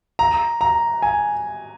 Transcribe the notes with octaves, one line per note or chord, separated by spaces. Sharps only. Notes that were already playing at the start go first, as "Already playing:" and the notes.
A#5
A#5
G#5